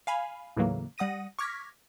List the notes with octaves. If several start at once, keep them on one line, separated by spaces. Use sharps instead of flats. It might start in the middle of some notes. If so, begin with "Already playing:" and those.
F5 G#5 B5
D#2 A2 C#3 E3 F#3 A#3
G3 F#5 D#6 A#6 D#7
C#6 D6 F6 G#6 A#6 B6